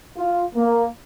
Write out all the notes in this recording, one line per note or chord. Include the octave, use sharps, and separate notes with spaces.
F4
A#3